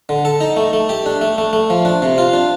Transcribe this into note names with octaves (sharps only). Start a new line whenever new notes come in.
D3
A4
D#4
A3
A3
G4
D4
A3
A3
A3
F3
D4
C3
F4
D4